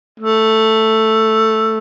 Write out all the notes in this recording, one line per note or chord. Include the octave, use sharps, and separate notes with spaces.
A3